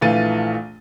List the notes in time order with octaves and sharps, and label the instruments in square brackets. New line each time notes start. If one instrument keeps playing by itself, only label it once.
[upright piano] A#1 E3 A3 F4 A6 D#7